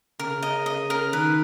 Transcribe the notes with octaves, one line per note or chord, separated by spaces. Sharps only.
C#3 A#4
D#5
D#5
A#4
D#3 B4